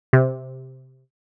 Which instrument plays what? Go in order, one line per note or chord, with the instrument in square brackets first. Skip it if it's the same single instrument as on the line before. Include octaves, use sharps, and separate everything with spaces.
[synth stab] C3